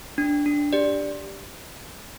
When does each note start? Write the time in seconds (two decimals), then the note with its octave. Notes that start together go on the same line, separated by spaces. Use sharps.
0.18 D4
0.46 D4
0.73 G4 D5